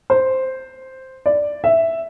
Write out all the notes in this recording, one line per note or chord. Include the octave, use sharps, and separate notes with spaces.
C5
D5
E5